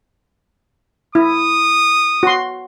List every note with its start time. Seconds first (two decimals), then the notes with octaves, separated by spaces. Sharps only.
1.15 E4 D#6
2.23 F#4 C6